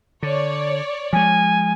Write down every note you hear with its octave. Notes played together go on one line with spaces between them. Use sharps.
D3 C#5 D5
F3 G#3 G#5